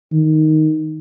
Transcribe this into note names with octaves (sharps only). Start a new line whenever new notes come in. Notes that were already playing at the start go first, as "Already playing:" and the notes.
D#3